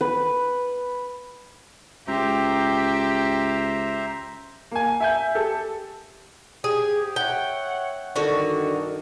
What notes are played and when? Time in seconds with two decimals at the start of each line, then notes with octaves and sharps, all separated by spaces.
0.01 B4
2.08 C#2 G4 C5 E5 A#5
4.71 A#3 G#5
5.00 E5 G#5 G6
5.35 G4 A4
6.64 G#2 G4 G#4
7.16 C#5 E5 F#5 G5
8.16 G2 D3 D#3 F#4